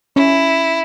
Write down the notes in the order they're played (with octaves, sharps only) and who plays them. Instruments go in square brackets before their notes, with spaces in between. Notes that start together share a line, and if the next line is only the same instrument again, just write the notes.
[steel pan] C#4 [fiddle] E4